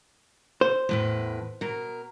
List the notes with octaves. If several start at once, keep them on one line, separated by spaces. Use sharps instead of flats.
C5
E2 A2 B4
B2 A#4